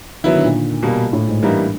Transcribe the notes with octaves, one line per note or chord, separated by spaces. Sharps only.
D#3 F#3 B3 E4
D3
A#2
B2 G3 A#3
A2
G#2
G2 E3 G3 A#3 D#4